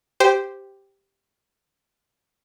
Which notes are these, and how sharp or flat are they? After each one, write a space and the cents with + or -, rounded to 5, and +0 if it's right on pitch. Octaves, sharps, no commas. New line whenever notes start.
G4 +0 C5 -10